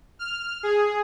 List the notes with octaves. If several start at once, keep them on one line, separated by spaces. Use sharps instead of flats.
F6
G#4